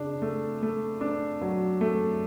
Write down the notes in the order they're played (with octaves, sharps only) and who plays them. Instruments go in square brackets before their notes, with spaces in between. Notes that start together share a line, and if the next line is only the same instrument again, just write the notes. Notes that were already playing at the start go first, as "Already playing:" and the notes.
Already playing: [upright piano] C#3 D4
A3
A3
D4
F#3
A3